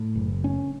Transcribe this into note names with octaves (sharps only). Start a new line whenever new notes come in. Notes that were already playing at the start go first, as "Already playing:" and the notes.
Already playing: A2
F#1
C#4